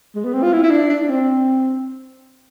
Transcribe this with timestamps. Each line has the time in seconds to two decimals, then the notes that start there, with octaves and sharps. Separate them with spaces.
0.15 G#3
0.24 B3
0.34 C4
0.43 F4
0.52 E4
0.63 E4
0.71 D4
0.90 D4
1.02 D4
1.09 C4